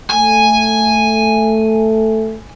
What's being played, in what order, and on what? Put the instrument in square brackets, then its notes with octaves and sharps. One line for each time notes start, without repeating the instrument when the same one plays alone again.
[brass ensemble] A3 [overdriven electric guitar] G#5